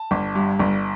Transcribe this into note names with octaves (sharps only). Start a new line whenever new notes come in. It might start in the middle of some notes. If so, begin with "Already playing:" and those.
Already playing: A5
G1
G2
G1